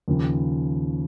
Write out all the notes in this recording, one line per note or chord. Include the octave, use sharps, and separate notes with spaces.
D#2 C#3 F3